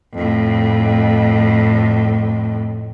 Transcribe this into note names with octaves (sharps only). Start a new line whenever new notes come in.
F2 A2